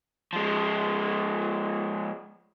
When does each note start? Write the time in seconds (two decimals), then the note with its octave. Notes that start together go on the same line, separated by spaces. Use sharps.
0.33 F3 G#3